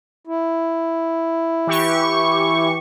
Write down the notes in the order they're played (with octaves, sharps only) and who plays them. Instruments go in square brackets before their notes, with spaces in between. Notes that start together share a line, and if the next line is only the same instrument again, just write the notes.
[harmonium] E4
[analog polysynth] E3 G4 C#6